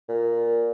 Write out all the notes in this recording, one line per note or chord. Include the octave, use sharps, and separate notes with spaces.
A#2